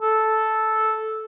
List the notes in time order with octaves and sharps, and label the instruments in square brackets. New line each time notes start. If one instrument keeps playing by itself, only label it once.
[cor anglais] A4